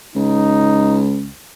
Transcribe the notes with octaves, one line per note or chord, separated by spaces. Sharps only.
C#2 D#4